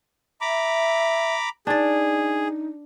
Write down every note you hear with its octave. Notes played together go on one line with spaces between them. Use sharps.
E5 A#5 B5 D6
D4 D#4 G#4 D5